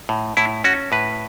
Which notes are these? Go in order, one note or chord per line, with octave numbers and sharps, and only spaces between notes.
A2
A2 E4
C#4 F#4
A2 B4